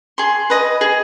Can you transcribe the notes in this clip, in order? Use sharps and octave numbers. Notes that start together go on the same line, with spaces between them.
G#4 C6
B4 D#5
G#4